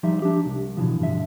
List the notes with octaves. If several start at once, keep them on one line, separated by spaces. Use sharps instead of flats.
F3 G3 D#4 E5
D4 G4
C2
B2 D3 E3 F3
G2 D3 E5